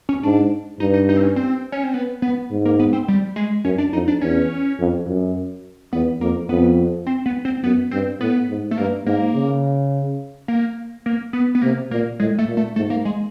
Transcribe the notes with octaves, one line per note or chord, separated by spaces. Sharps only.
C#4
G#2 D4
G2 D#4
D#4
D#4
C4
C#4
C4
C#4
C4
B3
B3
G#2
A#3
B3
C4
G3
G#3
F#2 C#4
D4
F2 D#4
D4
E2 C#4
F2
F#2
E2 B3
F2 A#3
F2 B3
C4
B3
C4
F#2 B3
G2 C4
A2 B3
G#2
A3
G2 A#3
G#2 A#3
C#3
A#3
A#3
B3
B3
C3 A#3
A#2 A#3
A2 G#3
A3
A#2
A3
G#2 A3
A#3
G#3